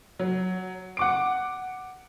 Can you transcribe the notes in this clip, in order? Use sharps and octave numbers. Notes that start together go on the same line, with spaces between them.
F#3
F#5 D6 D7